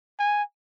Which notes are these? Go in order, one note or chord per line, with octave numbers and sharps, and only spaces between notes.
G#5